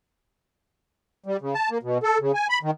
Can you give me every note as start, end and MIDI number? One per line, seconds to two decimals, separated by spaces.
1.26 1.37 55
1.41 1.54 49
1.54 1.70 81
1.70 1.78 58
1.83 1.98 47
2.03 2.18 69
2.21 2.32 49
2.34 2.47 80
2.49 2.58 83
2.63 2.71 51